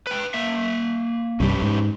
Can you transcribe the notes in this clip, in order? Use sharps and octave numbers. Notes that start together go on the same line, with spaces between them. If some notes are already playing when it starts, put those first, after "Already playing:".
B4 G5
A#3 E5
C2 G2 G3 C#4 G4 B4
G#2